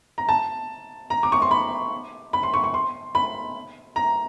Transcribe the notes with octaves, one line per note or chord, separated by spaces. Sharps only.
A#5
A5
A#5
D6
C#6
C6
B5
B5
C6
C#6
C#6
C6
B5
A#5